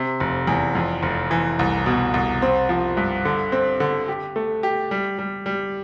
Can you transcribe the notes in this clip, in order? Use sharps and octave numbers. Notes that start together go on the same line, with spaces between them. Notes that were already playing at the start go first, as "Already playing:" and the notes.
Already playing: C3
F1
E2
F2
F1
E3
C2
B2
C2
C4
F3
G2
D3
C4
D3
G4
A3
G4
G3
G3
G3